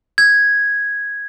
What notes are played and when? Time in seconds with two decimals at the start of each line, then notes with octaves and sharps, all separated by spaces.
0.18 G#6